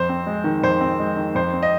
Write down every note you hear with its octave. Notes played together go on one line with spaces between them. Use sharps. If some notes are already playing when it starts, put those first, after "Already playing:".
Already playing: F2 C5
C4
G#3
D#3
F2 C5
C4
G#3
D#3
F2 C5
C4
D#5